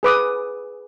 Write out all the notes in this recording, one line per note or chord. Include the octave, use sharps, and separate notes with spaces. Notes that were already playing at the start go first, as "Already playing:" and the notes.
G#4 B4 D6 D#6